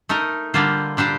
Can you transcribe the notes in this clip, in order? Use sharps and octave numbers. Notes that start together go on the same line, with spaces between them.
A3 D#4 A#4
D3 G3 A#3 F4 C5
A#2 G3 D4 G4 C5